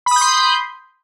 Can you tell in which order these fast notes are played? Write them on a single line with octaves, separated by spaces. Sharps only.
B5 D#6 G6 C6